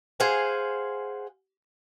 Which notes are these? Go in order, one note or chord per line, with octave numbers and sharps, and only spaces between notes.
G#4 C5 F5 F#5 G#5